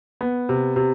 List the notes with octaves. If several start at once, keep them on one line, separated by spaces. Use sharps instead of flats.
B3
C3
C3